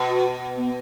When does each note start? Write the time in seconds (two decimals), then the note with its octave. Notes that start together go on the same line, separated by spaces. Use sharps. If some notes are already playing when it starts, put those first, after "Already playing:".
Already playing: B2
0.08 F#4
0.57 B3